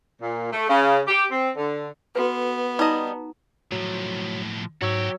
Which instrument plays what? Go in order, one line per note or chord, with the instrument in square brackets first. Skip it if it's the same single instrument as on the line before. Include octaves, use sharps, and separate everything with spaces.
[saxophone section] A#2
A3
C#3
G4
C4
D3
[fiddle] B3 [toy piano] F#4 A4 B4
[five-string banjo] G3 D#5 [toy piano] D#4 A5 A#5
[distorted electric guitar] A2 F3 [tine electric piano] F#3
[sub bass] G#2 [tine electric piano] F#3 C#5 E6 [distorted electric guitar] F#4 G4